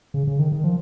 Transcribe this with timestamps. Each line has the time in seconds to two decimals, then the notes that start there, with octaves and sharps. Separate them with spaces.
0.14 C#3
0.27 C#3
0.39 D#3
0.52 D#3
0.64 F3